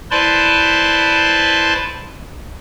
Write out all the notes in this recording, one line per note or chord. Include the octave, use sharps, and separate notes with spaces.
E4 B4 C5 D5 A5 C6